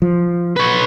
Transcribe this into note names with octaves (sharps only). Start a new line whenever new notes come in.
F3
B4 C#5